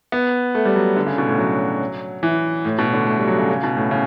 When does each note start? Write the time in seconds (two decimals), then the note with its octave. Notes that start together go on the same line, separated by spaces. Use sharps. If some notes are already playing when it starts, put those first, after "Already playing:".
0.12 B3
0.55 A3
0.65 G3
0.75 F#3
0.96 D3
1.07 C#3
1.18 B2
1.28 A2
1.39 F#3
2.23 E3
2.65 A2
2.78 B2
2.93 D3
3.07 A3
3.18 G3
3.27 F#3
3.38 C#3
3.49 C#3
3.63 B2
3.77 A2
3.91 C#3